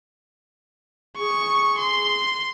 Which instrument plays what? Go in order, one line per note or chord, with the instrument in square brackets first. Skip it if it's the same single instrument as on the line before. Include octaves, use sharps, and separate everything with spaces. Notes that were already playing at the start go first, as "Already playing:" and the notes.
[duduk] G#4 [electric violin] C#6
[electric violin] C6